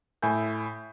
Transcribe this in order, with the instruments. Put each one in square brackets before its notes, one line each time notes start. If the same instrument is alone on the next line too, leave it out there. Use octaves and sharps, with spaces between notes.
[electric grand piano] A2 E5 G#5 B5 G6